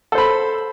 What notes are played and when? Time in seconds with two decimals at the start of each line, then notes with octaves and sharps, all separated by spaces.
0.12 A4
0.15 C5
0.18 B5